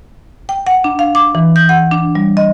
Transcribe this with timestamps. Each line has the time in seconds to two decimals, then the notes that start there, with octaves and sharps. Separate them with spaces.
0.49 G5
0.67 F#5
0.84 D4
0.99 F5
1.15 D6
1.35 E3
1.56 G6
1.69 F#5
1.92 D4
2.15 G3
2.37 D#5